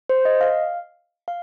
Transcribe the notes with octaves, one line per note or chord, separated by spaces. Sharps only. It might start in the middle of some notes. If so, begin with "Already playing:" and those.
C5
D#5
F5
F5